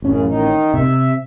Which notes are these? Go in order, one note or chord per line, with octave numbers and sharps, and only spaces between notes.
A1 F#2 C#3 C#4
D#3 D#4
C3 E5